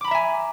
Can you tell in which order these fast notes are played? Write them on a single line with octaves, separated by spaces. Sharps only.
D6 B5 A#5 E5 G#5